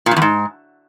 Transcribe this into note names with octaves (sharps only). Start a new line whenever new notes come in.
A#2
G2
E2
G#2